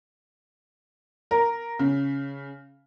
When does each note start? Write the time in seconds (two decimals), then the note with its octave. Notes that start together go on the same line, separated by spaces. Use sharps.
1.31 A#4
1.79 C#3